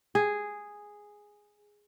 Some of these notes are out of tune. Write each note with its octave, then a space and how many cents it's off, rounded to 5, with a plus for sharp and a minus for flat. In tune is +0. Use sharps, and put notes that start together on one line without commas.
G#4 -5